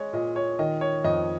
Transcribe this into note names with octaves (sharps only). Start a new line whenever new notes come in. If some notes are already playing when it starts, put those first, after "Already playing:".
Already playing: G#3 C#5
A#2 D#5
C#5
D#3 D#5
C#5
F2 D#5